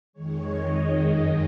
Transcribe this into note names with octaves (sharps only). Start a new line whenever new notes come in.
F2 D#3 G#3 C#5
D#5
F#2 D#3 G#3